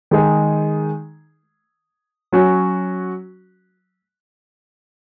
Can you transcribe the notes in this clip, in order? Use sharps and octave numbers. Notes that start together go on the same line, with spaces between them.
D#3 G#3 D#4 G#4
F#3 C#4 F#4